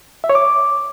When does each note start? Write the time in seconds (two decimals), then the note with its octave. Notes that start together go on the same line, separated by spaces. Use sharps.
0.24 E5
0.29 C#5
0.35 D6